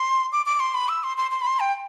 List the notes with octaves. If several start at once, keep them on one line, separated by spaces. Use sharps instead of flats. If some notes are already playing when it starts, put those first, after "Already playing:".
Already playing: C6
D6
D6
C6
B5
E6
C6
C6
C6
B5
C6
G5